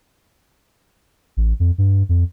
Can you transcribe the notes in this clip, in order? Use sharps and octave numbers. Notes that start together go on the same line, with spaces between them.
A1
F2
G2
F2